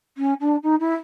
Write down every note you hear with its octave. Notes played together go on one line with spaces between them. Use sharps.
C#4
D4
D#4
E4